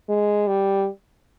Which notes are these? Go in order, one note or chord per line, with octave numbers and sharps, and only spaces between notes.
G#3
G3